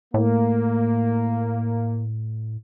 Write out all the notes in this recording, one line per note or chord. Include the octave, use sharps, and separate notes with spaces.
A2 A#3